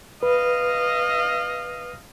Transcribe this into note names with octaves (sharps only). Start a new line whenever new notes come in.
B4 D#5 F5